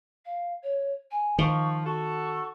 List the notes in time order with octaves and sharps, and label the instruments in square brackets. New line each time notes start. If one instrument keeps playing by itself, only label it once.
[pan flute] F5
C#5
G#5
[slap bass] D#3 [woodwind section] F3 [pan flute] C#6
[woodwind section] F#4 A4 [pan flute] C#6